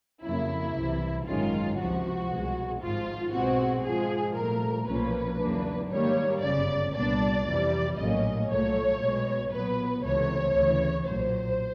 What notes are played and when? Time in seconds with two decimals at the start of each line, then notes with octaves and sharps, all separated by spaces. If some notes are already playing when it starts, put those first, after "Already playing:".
0.23 F2 C#3 F#3 A#3 E4
0.75 C2 C3 E3
1.26 G#1 F#2 D#3 G#3 C#4 F4
1.78 C#2 C3 F3 F#4
2.30 C2 B2 G#3
2.81 G#1 G#2 F3 F4
3.33 B1 B2 G#3 C4 F#4
3.85 G#2 F3 G#3 G#4
4.36 C2 A#2 F3 A3 A#4
4.88 B1 A#2 F3 A#3 C#4 B4
5.40 E2 C#3 F#3 A#3 D4
5.91 G#2 D#3 G3 A#3 C#5
6.42 G1 F#2 C#3 D5
6.94 C2 A#2 G3 B3 D4 D5
7.46 F2 C3 E3 G3
7.97 A#1 A2 F#3 A#3 C#4 D#5
8.49 C2 A#2 F#3 A3 C#5
9.00 B1 B2 G#3
9.52 A#2 F#3 B3 B4
10.04 C#2 C3 E3 A3 C4 C#5
10.55 D2 C#3 E3
11.07 B1 A#2 F#3 C5